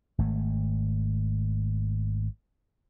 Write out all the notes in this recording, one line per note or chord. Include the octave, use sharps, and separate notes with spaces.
G#1 A3